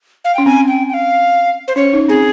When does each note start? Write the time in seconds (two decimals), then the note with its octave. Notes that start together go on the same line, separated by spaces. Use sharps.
0.25 F5
0.35 C#4 G5
0.46 C4 G#5
0.68 G5
0.89 G5
0.94 F5
1.68 C5
1.76 C#4 C#5
1.93 D#4
2.08 C4 G#4